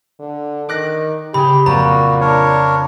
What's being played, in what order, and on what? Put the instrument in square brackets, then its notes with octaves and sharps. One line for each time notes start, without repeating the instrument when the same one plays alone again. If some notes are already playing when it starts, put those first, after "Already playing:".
[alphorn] D3
[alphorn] D#3 [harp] D6 F#6 A#6
[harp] C#3 G#4 [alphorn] G4 [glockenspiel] B5
[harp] F2 [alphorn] A#2 [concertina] F#4 [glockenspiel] A#5
[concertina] D4 A#4 C#5